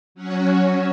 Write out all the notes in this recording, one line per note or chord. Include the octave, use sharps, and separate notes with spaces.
F#3 C#4 F#4 C#5